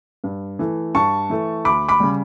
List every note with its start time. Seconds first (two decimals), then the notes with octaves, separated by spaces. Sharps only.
0.24 G2
0.59 E3 A3
0.95 G2 A5 C#6
1.30 E3 A3
1.65 D2 B5 D6
1.89 B5 D6
2.00 C#3 G3